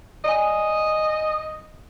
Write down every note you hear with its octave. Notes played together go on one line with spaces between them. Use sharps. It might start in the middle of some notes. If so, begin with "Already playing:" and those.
D5 D#5 G#5